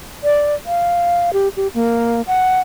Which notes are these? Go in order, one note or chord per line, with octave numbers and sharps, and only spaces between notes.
D5
F5
G4
G4
A#3
F#5